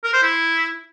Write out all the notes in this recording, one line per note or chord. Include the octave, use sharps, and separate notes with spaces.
A#4
C5
E4